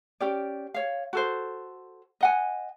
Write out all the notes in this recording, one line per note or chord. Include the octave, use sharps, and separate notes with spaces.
C#4 G4 D5
C#5 F5
F#4 A4 C5
D#5 F#5 G#5